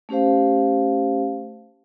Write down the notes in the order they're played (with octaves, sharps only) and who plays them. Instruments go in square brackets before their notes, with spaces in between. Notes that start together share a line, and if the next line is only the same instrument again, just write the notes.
[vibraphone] A3 C#4 G4 C5 F5